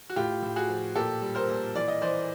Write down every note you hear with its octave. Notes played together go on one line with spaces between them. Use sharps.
F#4
A2 F4 G4
A2
F#4 G#4
F3
A#2 G4 A4
G3
A#4 C5
A#2
E3 D5
D#5
E3 C5 D5